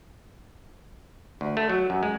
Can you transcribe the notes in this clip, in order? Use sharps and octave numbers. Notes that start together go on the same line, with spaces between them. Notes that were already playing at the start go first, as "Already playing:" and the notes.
D2
A3
F#3
F#2
G#3